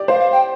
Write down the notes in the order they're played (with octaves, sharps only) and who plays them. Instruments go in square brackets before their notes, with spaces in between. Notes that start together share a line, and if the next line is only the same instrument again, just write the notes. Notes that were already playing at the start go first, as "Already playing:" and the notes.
Already playing: [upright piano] G4 D5
[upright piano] C5 [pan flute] F5
[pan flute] F5
G5